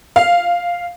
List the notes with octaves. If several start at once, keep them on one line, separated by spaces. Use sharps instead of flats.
F5